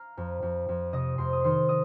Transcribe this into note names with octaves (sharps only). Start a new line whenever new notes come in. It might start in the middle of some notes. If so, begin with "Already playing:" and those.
Already playing: F5 A#5 F6
F2
F2
F2
C3 D#5 D#6
F2 C5 C6
D#6
D#3 C5 C6
D#5 D#6